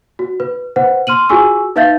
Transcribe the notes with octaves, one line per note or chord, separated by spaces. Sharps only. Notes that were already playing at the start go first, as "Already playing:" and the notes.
F#4
B4
B4 C5 F#5
C6 F6 D#7 F#7
F4 F#4 G#4 G#5 C#6 E6
D#4 B4 E5 F5 G6 A6